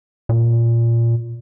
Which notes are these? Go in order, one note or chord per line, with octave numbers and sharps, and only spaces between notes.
A#2